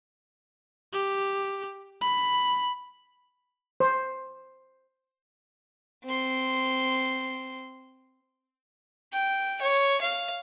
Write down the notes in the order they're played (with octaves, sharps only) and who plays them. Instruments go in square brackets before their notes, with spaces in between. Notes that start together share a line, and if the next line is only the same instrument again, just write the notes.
[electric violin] G4
B5
[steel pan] C5
[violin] C4 C6
[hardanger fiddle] G5
C#5
F5